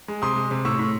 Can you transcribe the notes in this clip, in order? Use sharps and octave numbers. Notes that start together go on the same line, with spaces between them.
G#3
C3 C6 D#6
G#3
C3
A2 C#6 E6
A2